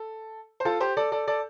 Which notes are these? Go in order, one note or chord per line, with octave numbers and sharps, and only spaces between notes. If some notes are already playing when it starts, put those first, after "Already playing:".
Already playing: A4
C5
F4 A4
G4 C5
A4 D5
A4 D5
A4 D5